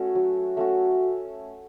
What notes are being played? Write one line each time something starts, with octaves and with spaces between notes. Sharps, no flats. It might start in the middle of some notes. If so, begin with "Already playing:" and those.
Already playing: A3 C#4 F#4
F#3
A3 C#4 F#4